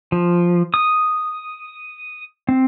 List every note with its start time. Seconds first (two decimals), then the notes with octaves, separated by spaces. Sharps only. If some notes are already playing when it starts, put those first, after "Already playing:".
0.12 F3
0.74 D#6
2.49 C4